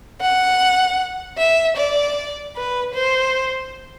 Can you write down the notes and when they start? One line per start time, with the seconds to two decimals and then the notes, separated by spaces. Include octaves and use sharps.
0.21 F#5
1.38 E5
1.77 D5
2.56 B4
2.95 C5